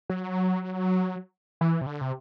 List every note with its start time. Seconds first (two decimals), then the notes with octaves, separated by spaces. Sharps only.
0.10 F#3
1.61 E3
1.81 C3
1.86 D3
2.01 C3